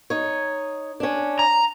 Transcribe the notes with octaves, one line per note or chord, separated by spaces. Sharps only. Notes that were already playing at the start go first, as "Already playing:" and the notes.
D#4 C#5
C#4 D4
A#5